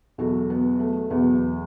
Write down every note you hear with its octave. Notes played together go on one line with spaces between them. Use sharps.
E2 B2 F#3 F#4 A4
B3
A3
E2 B2 F#3 B3